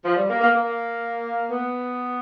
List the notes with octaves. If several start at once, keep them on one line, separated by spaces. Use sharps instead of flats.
F3
G3
A#3
A#3
A#3
B3